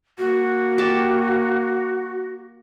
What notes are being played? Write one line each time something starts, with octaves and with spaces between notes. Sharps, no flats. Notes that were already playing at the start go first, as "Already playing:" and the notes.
A#3 F#4
G4 A5